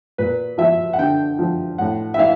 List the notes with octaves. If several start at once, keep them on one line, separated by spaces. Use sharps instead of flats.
A#2 B4
F3 E5
F#5
D3 G5
F3
A2 F#5
E5
E3 F5